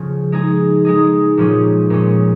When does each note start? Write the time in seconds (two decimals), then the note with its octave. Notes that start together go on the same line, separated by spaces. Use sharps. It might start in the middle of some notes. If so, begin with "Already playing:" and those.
Already playing: C#3 F3 C#4
0.32 G#3 D#4 G#4
0.85 G#3 D#4 G#4
1.38 A#2 F3 C#4 G#4
1.90 A#2 G#3 C#4